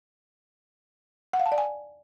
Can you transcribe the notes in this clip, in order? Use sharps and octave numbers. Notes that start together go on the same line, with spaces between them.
F#5
F5
A5
D5
G#5